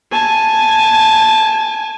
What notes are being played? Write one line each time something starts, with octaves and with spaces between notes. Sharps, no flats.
G#5 A5